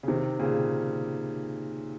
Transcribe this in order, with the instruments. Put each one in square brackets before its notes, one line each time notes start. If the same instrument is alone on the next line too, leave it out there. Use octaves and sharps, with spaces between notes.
[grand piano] C#3
C3 D#3
A#2 C#3